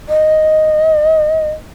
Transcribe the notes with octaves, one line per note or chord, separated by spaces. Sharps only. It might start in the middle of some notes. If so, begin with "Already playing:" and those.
D#5